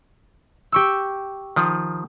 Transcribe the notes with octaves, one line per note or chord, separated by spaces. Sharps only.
G4 C#6 E6
D#3 F3